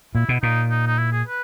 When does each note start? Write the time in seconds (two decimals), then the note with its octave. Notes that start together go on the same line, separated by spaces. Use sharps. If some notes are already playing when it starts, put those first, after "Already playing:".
0.15 A#2 E4
0.29 B2
0.42 A#2 D#4
0.71 D#4
0.87 D#4
0.98 E4
1.12 G#4
1.28 B4